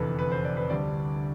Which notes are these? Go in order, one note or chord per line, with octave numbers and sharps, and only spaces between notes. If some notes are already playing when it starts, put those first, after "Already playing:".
Already playing: F1 E2 D3 A4 B4
B4
C5
D5
B4
D2 D3 G3 D5